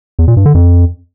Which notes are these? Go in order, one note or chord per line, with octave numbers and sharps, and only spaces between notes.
E2
A#2
G2
D3
F2